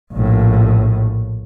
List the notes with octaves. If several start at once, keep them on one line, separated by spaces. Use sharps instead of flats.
A#1 A2